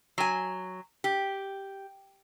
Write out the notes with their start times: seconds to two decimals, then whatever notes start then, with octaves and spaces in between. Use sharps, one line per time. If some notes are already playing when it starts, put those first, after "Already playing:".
0.18 F#3 G#5
1.04 G4